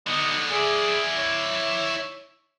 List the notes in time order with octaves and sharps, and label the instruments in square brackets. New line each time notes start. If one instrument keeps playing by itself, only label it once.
[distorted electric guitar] D3 B3 [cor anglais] D#4
[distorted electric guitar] E4 D5 [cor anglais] G#4
[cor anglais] C#5